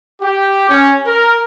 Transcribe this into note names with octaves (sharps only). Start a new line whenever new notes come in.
G4
C#4
A#4